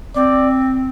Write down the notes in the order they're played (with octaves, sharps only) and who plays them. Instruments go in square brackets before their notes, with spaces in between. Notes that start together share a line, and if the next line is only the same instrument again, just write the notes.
[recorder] C4 [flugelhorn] D5